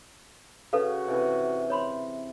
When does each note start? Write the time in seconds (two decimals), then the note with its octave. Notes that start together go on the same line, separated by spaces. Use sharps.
0.73 C#3 F#4 A4 B4 F5
1.08 C3 E3
1.70 C#5 B5 C6